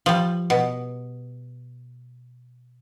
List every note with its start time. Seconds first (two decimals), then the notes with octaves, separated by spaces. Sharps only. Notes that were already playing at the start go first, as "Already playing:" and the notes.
0.06 F3 G3
0.50 B2